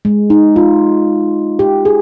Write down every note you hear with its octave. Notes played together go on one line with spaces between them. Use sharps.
G#3
D#4
F4
G4
G#4